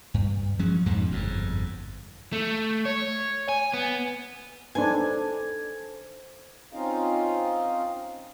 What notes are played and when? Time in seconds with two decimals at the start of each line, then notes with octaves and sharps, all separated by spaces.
0.14 G2
0.59 F3 F#3 G#3 C#4
0.86 F2 G#2 B2 D#3
1.11 G1 F2 G#2
2.33 A3
2.85 C#5
3.49 G#5
3.73 B3
4.75 D4 D#4 A4 B4 C5 G#5
6.73 C4 C#4 D#4 F4 D#5 F5